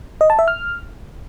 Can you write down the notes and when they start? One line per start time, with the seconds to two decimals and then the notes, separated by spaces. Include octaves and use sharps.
0.21 D#5
0.30 A5
0.39 E5
0.48 F6